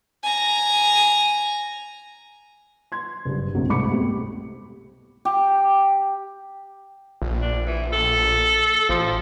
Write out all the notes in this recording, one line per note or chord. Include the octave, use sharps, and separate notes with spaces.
G#5 A#5
C6 G#6
F#1 G2
B1 F2 C#3 F#3 A#3
C2 G#2 A3 B5 D6 C#7
B2 G3 A3 C4
G4
A#1
D4
E3
A4
A1 F3